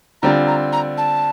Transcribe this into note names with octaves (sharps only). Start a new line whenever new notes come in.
D3 G3 C4 F4 A#5
A#5
A#5
A5